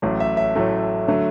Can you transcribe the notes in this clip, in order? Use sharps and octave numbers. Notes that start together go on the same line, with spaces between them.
A1 A2 F#3 A3
E5
E5
A1 A2 F#3 A3
D3 F#3 A3